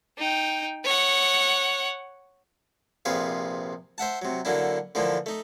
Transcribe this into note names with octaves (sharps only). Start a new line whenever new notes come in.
D#4 G5
C#5 F#5
A#1 C3 G#4 B4 F5
C5 E5 F#5 A5
C3 F#3
D3 F#3 A#3 D4 E4
D3 E3 F3 A#3 D4
A3 D#4